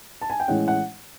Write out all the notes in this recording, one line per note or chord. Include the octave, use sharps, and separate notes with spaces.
A5
G#5
G5
A2 E3 G#3 C#4 F#5
F#5